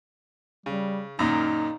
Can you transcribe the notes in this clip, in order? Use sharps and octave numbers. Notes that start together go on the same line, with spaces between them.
C#3 G3
F#2 A#2 D#3 D#4